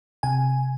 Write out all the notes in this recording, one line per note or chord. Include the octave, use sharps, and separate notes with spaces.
C3 G#5